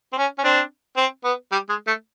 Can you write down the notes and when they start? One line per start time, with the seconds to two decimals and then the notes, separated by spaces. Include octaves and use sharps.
0.13 C4
0.18 C#4
0.39 C#4
0.44 C4 D4
0.97 C4
1.24 B3
1.52 G3
1.69 G#3
1.87 A3